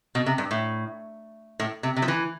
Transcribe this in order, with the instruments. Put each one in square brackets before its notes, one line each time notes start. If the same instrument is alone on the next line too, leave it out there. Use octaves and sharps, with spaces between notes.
[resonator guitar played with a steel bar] B2
C3
G2
A2
A2
C3
C3
F3
E3